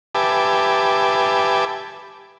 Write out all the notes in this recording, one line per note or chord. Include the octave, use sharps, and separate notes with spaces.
G4 B4 E5 G#5 A5 D6